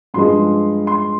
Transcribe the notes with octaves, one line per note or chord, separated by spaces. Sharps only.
G2 F3 G#3 C6
C6